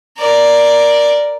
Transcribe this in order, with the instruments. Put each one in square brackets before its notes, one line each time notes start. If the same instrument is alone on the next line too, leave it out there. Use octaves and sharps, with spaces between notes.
[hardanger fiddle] A#4 D5